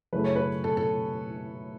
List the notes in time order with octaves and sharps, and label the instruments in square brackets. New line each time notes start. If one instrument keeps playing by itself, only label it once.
[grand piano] F#2 C#3 A3 E4 A4 [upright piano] B4
[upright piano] C#5
B4
A4
A4